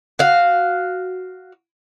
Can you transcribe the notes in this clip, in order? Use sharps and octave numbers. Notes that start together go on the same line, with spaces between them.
F#4 F5